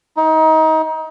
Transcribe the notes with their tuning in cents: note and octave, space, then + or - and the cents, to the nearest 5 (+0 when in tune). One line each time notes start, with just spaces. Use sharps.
D#4 +25